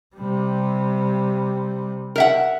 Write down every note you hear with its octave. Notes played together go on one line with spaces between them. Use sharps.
C3 G3
A#4 E5 F#5